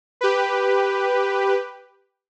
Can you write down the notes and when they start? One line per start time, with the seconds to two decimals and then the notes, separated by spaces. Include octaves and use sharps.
0.21 G4 B4